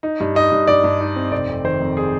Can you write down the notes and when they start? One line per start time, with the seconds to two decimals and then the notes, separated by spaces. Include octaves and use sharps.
0.03 D#4
0.20 G2
0.35 D#4 D#5
0.51 G2
0.67 G2 D5
0.84 G2
1.01 D#4
1.16 C4
1.31 F1 D5
1.49 F1
1.64 D#3 C5
1.80 F2
1.97 G#4